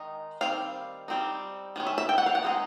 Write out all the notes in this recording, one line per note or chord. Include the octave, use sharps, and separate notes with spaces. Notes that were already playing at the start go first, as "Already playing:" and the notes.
Already playing: D#3 G#3 D#4
D#3 G3 C4 F5
G3 C4 D#4
D#3 G#3 C#4
E5
E5
G5
F#5
F5
F#5
D#3 G#3 C4 D#4